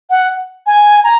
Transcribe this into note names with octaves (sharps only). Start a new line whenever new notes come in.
F#5
G#5
A#5